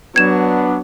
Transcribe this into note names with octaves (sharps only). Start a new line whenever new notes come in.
F#3 B3 D4 G#6 E7